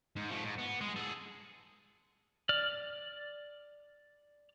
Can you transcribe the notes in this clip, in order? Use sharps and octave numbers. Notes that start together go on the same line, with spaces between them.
G#2
F3 A3
G#2
B3
G#3
G#4 A4
D5 F6